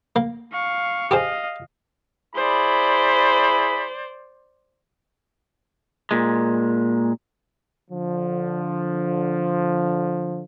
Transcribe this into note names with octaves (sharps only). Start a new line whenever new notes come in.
A#3
F5 C#6
G4 G#4 C5 D#5 F5
E4 G#4 C5 D5 B5
A#2 G#3
D3 F3